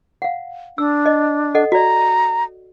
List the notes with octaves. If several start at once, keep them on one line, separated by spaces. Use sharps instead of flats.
F5 F#5
D4 E6
D#5
A4 D#5 F#5
F#4 D5 A#5